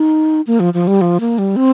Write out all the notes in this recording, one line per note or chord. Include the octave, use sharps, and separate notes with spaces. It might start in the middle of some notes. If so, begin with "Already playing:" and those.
Already playing: D#4
A#3
F3
F3
G3
F3
A#3
G3
C4